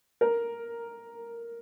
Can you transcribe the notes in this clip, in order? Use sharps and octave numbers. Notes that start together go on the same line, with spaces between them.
A#4